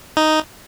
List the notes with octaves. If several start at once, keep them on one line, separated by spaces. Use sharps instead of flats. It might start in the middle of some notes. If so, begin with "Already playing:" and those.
D#4